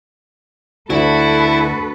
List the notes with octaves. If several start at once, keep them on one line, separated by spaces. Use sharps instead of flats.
D2 E4 F#4 A4 B4 E5